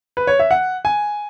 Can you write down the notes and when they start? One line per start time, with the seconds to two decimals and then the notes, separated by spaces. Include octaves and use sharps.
0.17 B4
0.27 C#5
0.39 E5
0.51 F#5
0.85 G#5